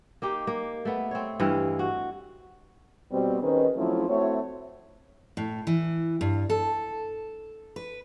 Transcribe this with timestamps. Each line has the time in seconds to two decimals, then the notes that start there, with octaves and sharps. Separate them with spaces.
0.22 A#3 D#4 G4
0.47 A#3
0.85 A3 B3
1.11 C4 C#5
1.40 G2 E3 D#5 F5
1.79 F#4
3.11 B2 G3 C4
3.41 D#3 C#4 D#4 G#4 B4 C5
3.76 F3 F#3 A3 C4 C#4 E4
4.08 A3 C4 E4 F#4 C#5
5.37 A2
5.67 E3
6.21 G2
6.50 A4
7.76 B4